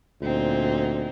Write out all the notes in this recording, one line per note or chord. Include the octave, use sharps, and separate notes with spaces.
D2 A#2 C4 D#4